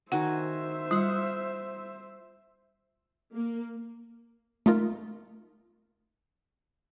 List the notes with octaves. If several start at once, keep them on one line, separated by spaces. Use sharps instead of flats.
D#3 F#4 C5 E5 F#5 G#5
G3 F4 F#5
A#3
A3 D#4 F4 A#4